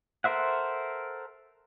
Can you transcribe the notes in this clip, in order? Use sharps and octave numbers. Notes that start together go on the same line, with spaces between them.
A4 A#4 C5 E5 F#5